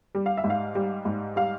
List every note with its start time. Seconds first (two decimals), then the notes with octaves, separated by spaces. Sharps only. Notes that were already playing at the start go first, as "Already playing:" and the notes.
0.15 G3
0.26 F5
0.37 E5
0.44 G#2
0.50 F5
0.75 G3
1.05 G#2
1.36 G3 F5